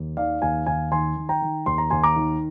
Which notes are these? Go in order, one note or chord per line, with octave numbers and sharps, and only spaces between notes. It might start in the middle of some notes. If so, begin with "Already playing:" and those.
Already playing: D#2
D#3 D5 F5
D#2 F5 G#5
D#2 F5 G#5
D#3 G#5 C6
D#3
G5 A#5
D#3
D#2 C6
A#5
D#2 G#5 C6
A#5 D6
D#3